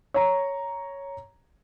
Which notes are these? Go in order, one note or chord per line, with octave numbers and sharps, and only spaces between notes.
C#5 A#5